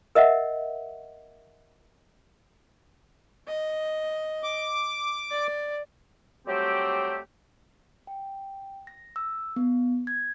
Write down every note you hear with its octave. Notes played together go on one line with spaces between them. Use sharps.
A#4 D#5 E5 F#5
D#5
D6
D5
F#3 G3 A3 C4 G4
G5
A#6
E6
B3
G#6